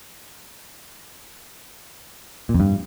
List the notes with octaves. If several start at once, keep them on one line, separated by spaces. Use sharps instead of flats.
A#2
F2
G2